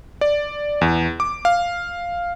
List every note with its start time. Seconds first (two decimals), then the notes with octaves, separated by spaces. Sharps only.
0.21 D5
0.81 E2
1.20 D6
1.45 F5